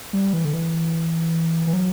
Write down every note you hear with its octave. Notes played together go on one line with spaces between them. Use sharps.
G3
E3
D3
E3
E3
F#3